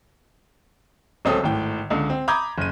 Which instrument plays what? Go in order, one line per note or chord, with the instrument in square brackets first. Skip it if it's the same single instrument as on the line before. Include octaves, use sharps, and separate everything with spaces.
[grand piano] D1 C#2 C4 C#4 A4 D#6
G#1 A2 G5
C#2 D3
C4
A#5 B5 D6 D#6 G6 G#6
F#1 D#7